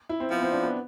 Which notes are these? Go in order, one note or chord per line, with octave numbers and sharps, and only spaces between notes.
E4
C4
F3 B3
C4
D4
B3